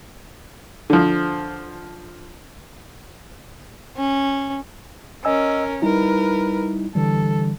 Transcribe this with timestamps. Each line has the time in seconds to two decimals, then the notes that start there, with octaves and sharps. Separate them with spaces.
0.90 D3 F3
3.96 C#4
5.25 C#4 A#4 D#5 G#5 E6
5.82 G3 D#4 E4 A#4 B4
6.95 D3 E3 G3 A4